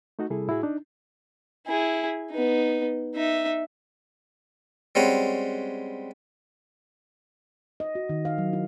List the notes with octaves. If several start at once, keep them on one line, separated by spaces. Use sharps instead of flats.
A3 D#4 F#4
C3 G3 E4 G#4 A4
A2 E4 F#4 G#4
D4 D#4
E4 G#4
B3 D#4
D#4 E5
G3 G#3 C4 C#4 F#4
D#5
F#4
D#3
F5
F#3
E4